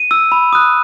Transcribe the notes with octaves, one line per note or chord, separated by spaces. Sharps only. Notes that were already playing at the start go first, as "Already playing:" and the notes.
Already playing: D#7
E6
B5
D#6 F#6